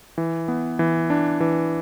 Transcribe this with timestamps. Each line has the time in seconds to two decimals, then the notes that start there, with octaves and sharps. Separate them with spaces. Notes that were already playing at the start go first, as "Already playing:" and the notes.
0.18 E3
0.48 B3
0.79 E3
1.10 D4
1.40 E3